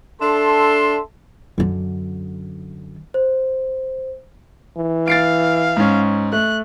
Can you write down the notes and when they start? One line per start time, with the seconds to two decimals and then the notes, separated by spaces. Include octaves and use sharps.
0.21 D4 A4 E5 A5 C6
1.58 F#2 D3
3.14 C5
4.77 E3
5.08 F5 A6 C7 D7
5.77 G#2 C#4
6.32 A3 F#6